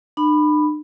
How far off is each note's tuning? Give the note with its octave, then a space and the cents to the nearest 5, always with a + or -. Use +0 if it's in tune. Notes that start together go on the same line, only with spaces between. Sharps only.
D4 +45 B5 +5